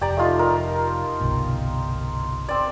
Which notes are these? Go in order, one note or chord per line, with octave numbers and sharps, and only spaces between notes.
F1 G4 D5 A#5
A3 D#4 F4
A#4
G1 C2 B2
C4 D5